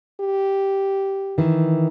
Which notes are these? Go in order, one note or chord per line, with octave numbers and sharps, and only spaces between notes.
G4
D#3 E3